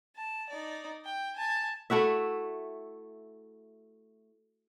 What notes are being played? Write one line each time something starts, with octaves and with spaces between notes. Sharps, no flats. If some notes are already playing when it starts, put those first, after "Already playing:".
A5
D#4 D5
G5
G#5 A5
A3 E4 F#4 E5